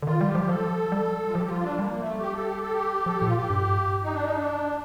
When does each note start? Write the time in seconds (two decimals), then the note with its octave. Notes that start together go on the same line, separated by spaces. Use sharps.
0.02 D3
0.07 D#3 F4
0.21 G3
0.28 G4
0.35 F3
0.49 F3 A4
0.92 G3
1.29 F4
1.35 F3 G4
1.45 G4
1.49 F4
1.63 D4
1.78 G3 A#3
2.00 A3
2.21 G4
2.34 A4
2.47 G4
2.60 A4
2.73 G4
3.06 F3 A4
3.16 G4
3.22 A#2 F4
3.37 G4
3.50 G2
4.03 D#4
4.13 D4
4.25 D#4
4.35 D4